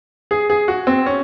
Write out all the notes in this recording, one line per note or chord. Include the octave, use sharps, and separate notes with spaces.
G#4
G#4
F#4
C4
C#4